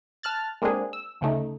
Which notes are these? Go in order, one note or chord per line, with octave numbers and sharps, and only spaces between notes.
A5 F6 F#6 A6
G#3 A#3 C4 D4 G#4
E6
D2 C#3 A3 D#4